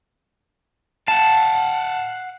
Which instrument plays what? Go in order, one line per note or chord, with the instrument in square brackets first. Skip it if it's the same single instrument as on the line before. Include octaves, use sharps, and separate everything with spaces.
[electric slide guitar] F5 F#5 [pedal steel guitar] A5